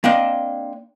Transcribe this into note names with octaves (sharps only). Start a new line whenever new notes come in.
A#3 C4 D4 D#5